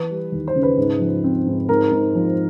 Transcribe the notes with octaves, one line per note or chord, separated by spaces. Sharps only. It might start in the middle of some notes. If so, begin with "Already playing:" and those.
Already playing: E3 B4
G3
D#2
C5
C#3
B4
G#2
F3
C4
G#2
G#2 A#4
G#2
F3